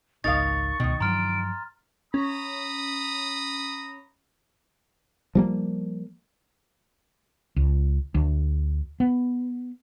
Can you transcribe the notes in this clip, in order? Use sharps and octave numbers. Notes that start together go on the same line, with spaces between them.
G#1 C#2 D#4 A#4 F5 C#6 A6
C#2 B2 D#3
G2 F3 F#3 A#5 C6 F6 D7
C#4 A#5 B5 D#6
F3 G3 A#3
C#2
D2
B3